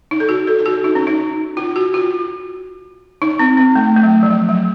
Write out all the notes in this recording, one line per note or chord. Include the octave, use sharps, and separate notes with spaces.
D#4
A4
F#4
A4
A4
F#4
D#4
C#4
D#4
F4
F#4
F4
D#4
C4
C4
A3
A3
F#3
F3
F#3
F#3